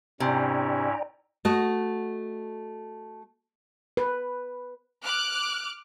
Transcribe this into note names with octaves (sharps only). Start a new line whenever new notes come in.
G#2 C3 C#4 D4 E4 D5 G5 A#5
A3 F#4 D#5
B4
D6 F6 F#6